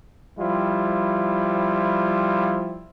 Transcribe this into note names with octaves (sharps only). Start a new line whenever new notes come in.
F3 G3 E4 F4